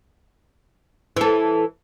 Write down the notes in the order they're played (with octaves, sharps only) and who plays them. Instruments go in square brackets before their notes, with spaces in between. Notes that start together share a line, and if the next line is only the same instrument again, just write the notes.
[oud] E3 A4